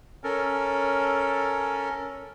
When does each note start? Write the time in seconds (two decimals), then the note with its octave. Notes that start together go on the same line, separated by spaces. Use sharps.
0.24 C#4 A4 A#4